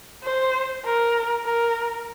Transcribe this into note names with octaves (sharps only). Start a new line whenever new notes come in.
C5
A#4
A#4